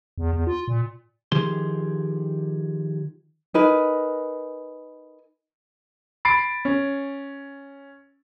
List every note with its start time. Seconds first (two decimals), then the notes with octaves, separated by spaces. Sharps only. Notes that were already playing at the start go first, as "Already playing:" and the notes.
0.18 E2
0.33 E2
0.47 F4
0.68 A#2
1.32 D#3 F3 G4 G#4 C6
3.54 D#4 A#4 B4 G#5
6.25 B5 A6 C7 D7
6.65 C#4